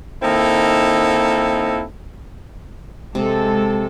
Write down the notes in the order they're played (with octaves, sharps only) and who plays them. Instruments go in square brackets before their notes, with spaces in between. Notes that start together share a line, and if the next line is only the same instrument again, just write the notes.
[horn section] D#3 A#3 C4 D#4 E4 A4
[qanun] C3 [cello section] G#3 A4